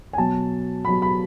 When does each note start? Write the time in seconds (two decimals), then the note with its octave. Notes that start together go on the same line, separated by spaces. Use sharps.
0.13 G#5
0.18 B2 F#3 A5
0.84 B2 F#3 B5
1.02 B5